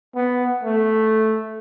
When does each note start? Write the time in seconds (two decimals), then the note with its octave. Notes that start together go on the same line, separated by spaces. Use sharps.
0.15 B3
0.63 A3